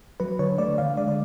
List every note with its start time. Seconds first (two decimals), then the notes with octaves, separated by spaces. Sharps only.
0.20 F#3 B4
0.39 D3 C#5
0.58 A3 D5
0.78 D3 F5
0.97 G#3 D5
1.08 D5